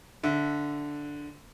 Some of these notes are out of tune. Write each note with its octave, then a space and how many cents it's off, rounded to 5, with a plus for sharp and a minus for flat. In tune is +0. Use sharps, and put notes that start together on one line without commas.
D3 -5 E5 +0